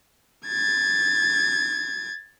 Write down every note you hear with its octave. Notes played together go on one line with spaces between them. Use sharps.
G#6 A6